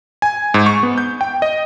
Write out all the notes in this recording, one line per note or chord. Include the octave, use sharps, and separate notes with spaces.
G#5
G#2
C#6
B3
G6
G5
D#5